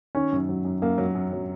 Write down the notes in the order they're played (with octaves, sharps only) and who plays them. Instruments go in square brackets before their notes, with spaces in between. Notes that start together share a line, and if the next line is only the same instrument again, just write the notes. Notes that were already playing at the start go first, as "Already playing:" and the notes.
[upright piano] D#3 [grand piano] C#4
[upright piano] F#2
F#3
F#2
[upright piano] F#2 [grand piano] A#3
[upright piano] F#3
F#2
F#3